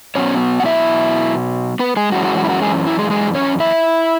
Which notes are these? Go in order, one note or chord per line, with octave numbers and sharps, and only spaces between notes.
B2 F#3 B3 C#4 C#5
F#5
E4 E5
B3 B4
G#3 G#4
F#2 E3 G#3 C#4 F#4
F#4
F#4
E4
F#4
G#3 G#4
E4
G#3 G#4
G#3 G#4
C#4 C#5
E4 E5